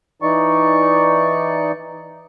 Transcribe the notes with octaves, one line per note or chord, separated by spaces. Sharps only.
E3 D#4 D5 C#6